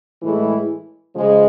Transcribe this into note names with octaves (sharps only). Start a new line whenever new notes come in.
A2 E3 G#3 E4
C#3 F3 G#3